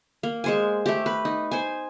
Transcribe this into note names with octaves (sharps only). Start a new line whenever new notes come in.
A#3
G#3 C5 G#5
A3 G4
B4
D#4
C5 G#5